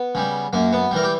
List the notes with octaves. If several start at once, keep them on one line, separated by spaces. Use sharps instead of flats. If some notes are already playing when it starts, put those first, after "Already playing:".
Already playing: B3
C#3 G3
F#2 A#3
B3
E3 G3 A#4
G4